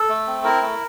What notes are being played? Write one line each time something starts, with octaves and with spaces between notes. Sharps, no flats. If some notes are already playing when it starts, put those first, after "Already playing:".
Already playing: A4
A3
C4
E4 A#4
A3